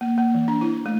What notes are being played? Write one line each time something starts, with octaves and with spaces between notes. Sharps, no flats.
A#3
A#3
E3
D4
E4
A3